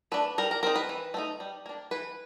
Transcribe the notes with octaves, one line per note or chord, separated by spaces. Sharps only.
A3 D4 B4
G3 A#4
A#4
C4 D#4 A#4
B4
E3
A3 C4 D#4
G3
A#3 D4
E3 B4